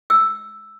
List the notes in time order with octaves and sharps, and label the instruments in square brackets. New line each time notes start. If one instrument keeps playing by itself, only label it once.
[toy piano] E6